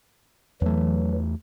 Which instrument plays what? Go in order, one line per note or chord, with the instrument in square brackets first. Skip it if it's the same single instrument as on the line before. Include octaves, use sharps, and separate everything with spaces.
[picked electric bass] E2 A3 [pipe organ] E3 F#3